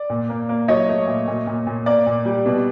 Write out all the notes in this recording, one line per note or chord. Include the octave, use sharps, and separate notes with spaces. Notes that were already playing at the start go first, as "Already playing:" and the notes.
Already playing: D5
A#2
A#3
A#3
F#3 C#5 D#5
A3
A#2
A#2
A#2
A#2
A#3 D5
A#2
G3
B2